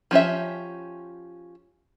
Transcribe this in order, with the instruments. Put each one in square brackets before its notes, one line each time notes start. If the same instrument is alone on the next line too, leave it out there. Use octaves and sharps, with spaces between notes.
[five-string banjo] F3 C#4 G4 E5